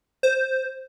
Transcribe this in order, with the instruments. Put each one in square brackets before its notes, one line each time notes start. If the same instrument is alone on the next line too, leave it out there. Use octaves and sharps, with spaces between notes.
[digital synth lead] C5